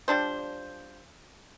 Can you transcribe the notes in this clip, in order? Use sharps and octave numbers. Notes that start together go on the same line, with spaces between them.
F3 G3 D4 C5